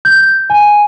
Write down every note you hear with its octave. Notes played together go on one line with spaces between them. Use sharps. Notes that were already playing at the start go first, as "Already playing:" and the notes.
G6
G#5